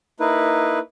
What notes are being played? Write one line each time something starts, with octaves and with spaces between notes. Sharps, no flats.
A#3 D#4 E4 B4